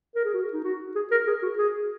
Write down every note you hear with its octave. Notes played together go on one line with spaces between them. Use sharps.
A#4
G#4
F#4
D#4
F#4
G#4
A#4
G#4
F#4
G#4